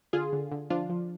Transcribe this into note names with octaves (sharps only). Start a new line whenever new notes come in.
D3 F4 G#4
D3
D3
F3 D4 F4
F3